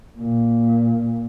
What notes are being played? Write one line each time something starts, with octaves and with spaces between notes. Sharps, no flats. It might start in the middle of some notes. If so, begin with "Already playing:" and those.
A#2